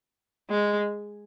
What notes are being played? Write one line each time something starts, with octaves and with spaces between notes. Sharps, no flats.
G#3